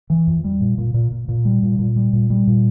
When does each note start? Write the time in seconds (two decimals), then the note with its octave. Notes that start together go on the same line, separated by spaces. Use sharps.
0.10 E3
0.27 F2
0.44 G3
0.60 A#2
0.78 A#2
0.94 A#2
1.12 A#2
1.28 A#2
1.45 G3
1.63 A#2
1.79 A#2
1.96 G3
2.13 A#2
2.30 G3
2.47 A#2